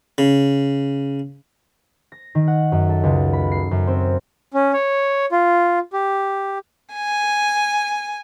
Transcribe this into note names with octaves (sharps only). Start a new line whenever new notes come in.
C#3
A#6
D#3
F#5
F#2
A4
C#2
B5
C7
F#2
C4
C#4
C#5
F4
G4
G#5